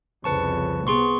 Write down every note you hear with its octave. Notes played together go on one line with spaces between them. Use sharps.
C2 F2 C#3 B4 A5 C#6
C3 B3 G#4 C6 C#6